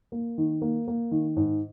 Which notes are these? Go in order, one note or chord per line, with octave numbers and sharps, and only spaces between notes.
A#3
D#3
A#3
A#3
D#3
G#2